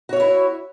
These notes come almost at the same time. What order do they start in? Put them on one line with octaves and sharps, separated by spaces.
F#4 C#5 E5 E4